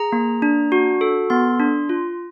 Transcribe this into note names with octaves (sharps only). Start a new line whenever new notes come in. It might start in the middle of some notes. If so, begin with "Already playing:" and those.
Already playing: G#4 A#5
A#3
D4
F#4
A4
B3 C6
D4
F4